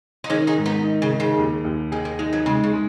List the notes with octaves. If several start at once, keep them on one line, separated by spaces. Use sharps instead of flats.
D#4
D#3 G#3 C#4
D#4 G#4
G#2
B3 D#4
D#4
C#3
D#4
C#3
D#2
D#2
D#3 G#4
D#3
G#3 D#4
F#3 B3
C#3 G#3
C#3
G#3